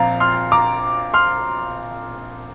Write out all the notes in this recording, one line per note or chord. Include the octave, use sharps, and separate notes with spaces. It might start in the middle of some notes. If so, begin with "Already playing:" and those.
Already playing: A#1 A#2 F3 C4 F5 A#5
C6 F6
A#5 D6
C6 F6